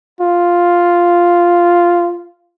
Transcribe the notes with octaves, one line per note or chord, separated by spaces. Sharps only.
F4